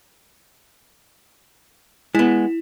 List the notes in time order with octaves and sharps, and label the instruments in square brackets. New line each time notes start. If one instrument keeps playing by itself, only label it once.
[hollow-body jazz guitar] G#3 B3 [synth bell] E4